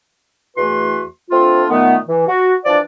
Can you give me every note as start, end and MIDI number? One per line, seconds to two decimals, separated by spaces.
0.57 1.03 40
0.57 1.03 52
0.57 1.03 57
0.57 1.03 66
0.57 1.03 71
0.57 1.03 84
1.31 1.65 57
1.31 1.65 60
1.31 1.65 62
1.31 1.65 65
1.70 1.96 46
1.70 1.96 51
1.70 1.96 57
1.70 1.96 59
2.08 2.25 52
2.27 2.55 66
2.66 2.79 52
2.66 2.79 53
2.66 2.79 62
2.66 2.79 74